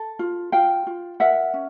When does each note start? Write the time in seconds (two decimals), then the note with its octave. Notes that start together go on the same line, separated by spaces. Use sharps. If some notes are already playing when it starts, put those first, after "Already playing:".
Already playing: A4
0.19 F4
0.52 F4 F5 G5
0.87 F4
1.20 A#4 E5 F#5
1.54 C#4